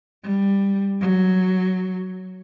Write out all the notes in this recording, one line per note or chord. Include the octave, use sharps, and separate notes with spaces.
G3
F#3